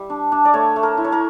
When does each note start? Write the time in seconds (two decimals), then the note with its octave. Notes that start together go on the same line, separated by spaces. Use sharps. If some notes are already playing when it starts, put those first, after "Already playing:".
Already playing: G3 E5
0.10 D4
0.32 D4
0.45 D5
0.54 A3 C#5
0.76 A3
0.83 A#4
0.98 E4
1.04 C#5
1.12 A#4